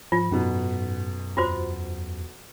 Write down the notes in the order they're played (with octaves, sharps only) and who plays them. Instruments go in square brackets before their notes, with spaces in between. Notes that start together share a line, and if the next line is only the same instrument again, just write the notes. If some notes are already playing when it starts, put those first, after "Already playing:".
[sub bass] G#2 [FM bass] F3 [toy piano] F4
[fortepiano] B1 B2 B3 [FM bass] F#2
[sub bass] E2 [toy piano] F4 F#4 C5